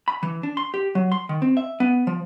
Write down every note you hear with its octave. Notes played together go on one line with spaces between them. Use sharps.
B5
E3
D4
C6
G4
F#3
C6
D#3
C4
E5
B3
F3